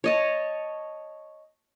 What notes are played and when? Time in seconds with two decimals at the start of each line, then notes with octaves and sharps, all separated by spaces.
0.04 C#5 D#5 A5